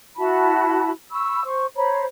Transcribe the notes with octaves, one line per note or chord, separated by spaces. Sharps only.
E4 F#4 A5 B5
B5 C#6 E6
C5 C#6
C5 C#5 A#5 B5